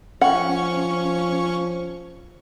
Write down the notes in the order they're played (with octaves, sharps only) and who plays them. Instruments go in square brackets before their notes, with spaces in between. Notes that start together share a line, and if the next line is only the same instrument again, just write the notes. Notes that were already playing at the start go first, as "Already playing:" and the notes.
[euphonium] F3 [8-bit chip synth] C#4 C#6 [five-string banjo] F#5